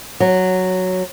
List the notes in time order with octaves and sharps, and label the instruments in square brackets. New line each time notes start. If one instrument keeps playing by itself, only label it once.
[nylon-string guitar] F#3